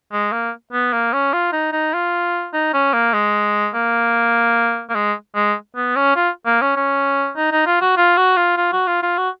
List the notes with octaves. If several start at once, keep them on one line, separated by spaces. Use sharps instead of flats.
G#3
A#3
B3
A#3
C#4
F4
D#4
D#4
F4
D#4
C#4
A#3
G#3
A#3
A#3
G#3
G#3
B3
C#4
F4
A#3
C#4
C#4
D#4
D#4
F4
F#4
F4
F#4
F4
F4
F#4
F4
F4
F#4